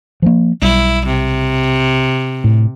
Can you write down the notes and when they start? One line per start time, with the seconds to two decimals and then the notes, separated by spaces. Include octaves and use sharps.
0.22 F3 F#3 A#3
0.62 B1 G3 E4
1.06 C3
2.44 A2